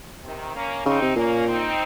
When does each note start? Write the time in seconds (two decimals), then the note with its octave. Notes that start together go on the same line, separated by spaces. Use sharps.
0.23 C3 D#3
0.55 A#3 C#4
0.85 C#3 C4 D#4
1.02 C3
1.16 A#2 A#3 C#4
1.48 C4 D#4